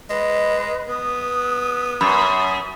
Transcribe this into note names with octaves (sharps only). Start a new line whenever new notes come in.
G#3 B4
B3 D#6
F#2 B5 D#6